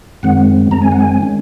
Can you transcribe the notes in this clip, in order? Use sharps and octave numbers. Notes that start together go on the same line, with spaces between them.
F#2 D#3 G#3 C4 F#5
F#2 D#3 G#3 C4 A#5
G#5
F#5
G#5
D#3 G#3 C#4